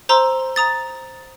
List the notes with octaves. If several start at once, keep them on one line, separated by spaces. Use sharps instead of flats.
C5 A#5 C6 E6
A#5 D#6 A6